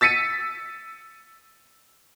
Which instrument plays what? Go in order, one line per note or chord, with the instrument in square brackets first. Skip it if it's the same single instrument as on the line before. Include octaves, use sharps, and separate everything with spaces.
[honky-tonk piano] E6 A6 B6 C#7 D#7